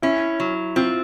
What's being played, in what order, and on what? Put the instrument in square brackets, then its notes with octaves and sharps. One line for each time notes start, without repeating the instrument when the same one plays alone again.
[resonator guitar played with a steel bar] C#4 [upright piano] E4
[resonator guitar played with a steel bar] F#3
[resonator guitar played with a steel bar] C4 [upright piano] F4